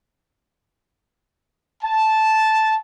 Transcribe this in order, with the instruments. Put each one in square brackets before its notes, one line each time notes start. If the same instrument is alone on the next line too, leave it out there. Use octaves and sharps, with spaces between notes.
[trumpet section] A5